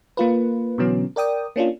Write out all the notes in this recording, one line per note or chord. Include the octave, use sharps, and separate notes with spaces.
A#3 F4 B4
B2 D3 E3 F#3 B3 C#4
A#4 D5 G5 D#6
A#3 C#4 D4 F4